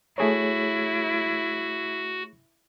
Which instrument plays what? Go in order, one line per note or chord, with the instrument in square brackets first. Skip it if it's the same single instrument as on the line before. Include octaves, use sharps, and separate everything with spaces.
[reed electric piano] A3 G#4 C#5 [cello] E4 [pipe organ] F#4